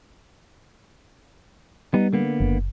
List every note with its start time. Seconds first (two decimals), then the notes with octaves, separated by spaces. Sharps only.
1.94 G3 B3 D#4
2.13 D3 A#3 B3
2.40 F#1